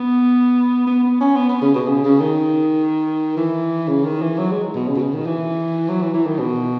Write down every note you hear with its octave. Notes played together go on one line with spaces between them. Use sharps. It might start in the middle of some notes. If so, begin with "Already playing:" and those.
Already playing: B3
B3
B3
C#4
B3
B3
C#3
B2
C#3
C#3
D#3
E3
C#3
D#3
E3
F#3
G#3
B2
C#3
B2
C#3
D#3
E3
F#3
E3
E3
D#3
B2